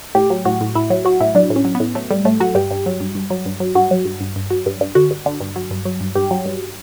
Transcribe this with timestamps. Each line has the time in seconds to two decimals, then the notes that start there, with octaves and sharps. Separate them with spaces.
0.15 A2 G4
0.30 F#3
0.45 A2 F#4
0.61 A2
0.75 A2 E4
0.90 F#3
1.05 F#3 F#4
1.20 A2 E4
1.35 F#3 D4
1.50 A2
1.56 C#4
1.65 F#3
1.75 B3
1.80 A2
1.95 F#3 A3
2.11 A2 G3
2.25 A2 A3
2.40 F#3 F#4
2.55 G2 G4
2.71 G2
2.86 F#3
3.00 G2
3.15 G2
3.30 F#3
3.46 G2
3.60 F#3
3.75 G2 F#4
3.91 F#3
4.05 G2
4.20 G2
4.36 G2
4.50 F#3
4.66 G2
4.81 G2
4.95 D3 F#4
5.11 G2
5.26 D3
5.40 G2
5.56 F#3
5.71 G2
5.85 F#3
6.01 G2
6.15 G2 G4
6.31 F#3
6.46 G2